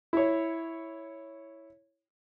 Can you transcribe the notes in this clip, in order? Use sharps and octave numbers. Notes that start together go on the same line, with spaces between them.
E4 C#5